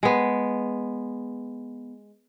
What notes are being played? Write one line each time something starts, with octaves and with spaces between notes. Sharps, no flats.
G#3 B3